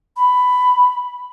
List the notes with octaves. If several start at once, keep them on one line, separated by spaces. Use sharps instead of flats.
B5